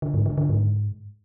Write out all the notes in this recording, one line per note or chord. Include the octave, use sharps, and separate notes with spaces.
D3
G#2
D3
D3
G#2